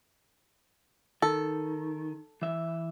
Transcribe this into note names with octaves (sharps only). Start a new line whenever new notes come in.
D#3 A4
E3 E5